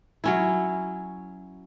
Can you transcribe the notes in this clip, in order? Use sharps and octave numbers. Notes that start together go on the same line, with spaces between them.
F#3 C#4 E4